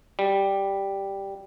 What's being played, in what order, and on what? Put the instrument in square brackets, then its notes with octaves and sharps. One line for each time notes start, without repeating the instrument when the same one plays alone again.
[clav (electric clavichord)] G3